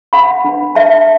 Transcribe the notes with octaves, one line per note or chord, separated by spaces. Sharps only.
F#5 B5
D4 B4
E5 A5